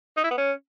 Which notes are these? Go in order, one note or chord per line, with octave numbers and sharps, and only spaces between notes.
D#4
E4
B3
C#4